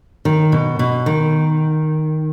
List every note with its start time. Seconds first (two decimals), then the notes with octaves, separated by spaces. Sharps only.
0.25 D#3
0.52 B2
0.79 B2
1.06 D#3